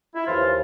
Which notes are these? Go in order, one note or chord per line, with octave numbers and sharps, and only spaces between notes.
E4
D#2 C#3 E3 F3 F4